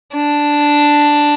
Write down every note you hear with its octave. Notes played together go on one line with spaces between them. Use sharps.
D4